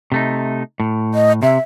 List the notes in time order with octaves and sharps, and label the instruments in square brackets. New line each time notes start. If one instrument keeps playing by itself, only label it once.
[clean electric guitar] C3 A3 D#4
A2
[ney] D#5
[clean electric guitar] C3 [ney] E5